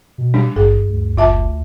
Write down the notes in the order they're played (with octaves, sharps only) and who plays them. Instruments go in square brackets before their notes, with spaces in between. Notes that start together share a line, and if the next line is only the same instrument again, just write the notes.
[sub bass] B2
[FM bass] G3 [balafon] D4
[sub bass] G#1 [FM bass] G2 [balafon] G#4
[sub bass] D2
[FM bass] F#1 [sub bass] D2 [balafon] F4 E5 A5